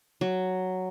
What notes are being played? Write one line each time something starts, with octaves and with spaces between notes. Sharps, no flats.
F#3